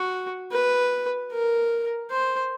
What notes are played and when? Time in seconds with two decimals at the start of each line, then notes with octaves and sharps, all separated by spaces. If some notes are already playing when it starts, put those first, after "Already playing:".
Already playing: F#4
0.52 B4
1.32 A#4
2.11 C5